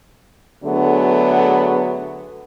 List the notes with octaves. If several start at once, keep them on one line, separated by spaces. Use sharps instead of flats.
D3 F#3 A3 B3 G#4